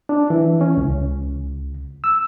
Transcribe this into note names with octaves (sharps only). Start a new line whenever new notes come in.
D4
E3
C#4
C#2
E6